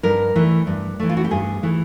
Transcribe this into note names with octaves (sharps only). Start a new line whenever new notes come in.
G2 A#4
E3 A3
G2
E3 A3
F4
F#4
G4
G2 G#4
E3 A3